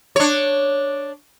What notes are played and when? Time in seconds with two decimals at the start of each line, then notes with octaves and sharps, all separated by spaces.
0.16 D4 C#5